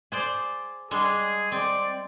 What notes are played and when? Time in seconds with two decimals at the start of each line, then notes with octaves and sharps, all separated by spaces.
0.12 G#4 C5 D5
0.91 G3 G#3 D4 G#4
1.52 C4 D5